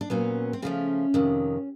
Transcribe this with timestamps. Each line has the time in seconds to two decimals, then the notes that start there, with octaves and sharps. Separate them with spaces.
0.01 D4
0.10 A#2 F#3 B3 C#4
0.53 C4
0.62 C#3 F3 A3 C#4
1.14 F2 C3 D#3